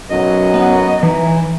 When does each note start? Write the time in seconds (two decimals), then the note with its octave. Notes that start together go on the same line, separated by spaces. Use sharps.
0.11 B1 F#2 F#3 D#5
0.54 B3
1.03 E3 D#4